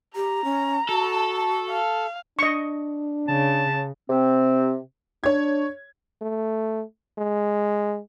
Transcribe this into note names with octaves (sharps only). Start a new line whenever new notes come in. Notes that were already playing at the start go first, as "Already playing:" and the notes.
G4 A#5
C#4
F#4 A4
F5
D4 D#5 C#6
C#3 A5
C3 C4
D4 C#5 G#6
A3
G#3